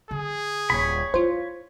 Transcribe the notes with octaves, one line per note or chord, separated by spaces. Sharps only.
D3 G#4
D#1 C#5 B5
E4 F4 C5